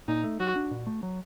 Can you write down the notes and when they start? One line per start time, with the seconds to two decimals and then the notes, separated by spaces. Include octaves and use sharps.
0.08 A#2 D#4
0.24 A3
0.40 F#3 F#4
0.56 D4
0.71 A#2
0.87 A3
1.03 F#3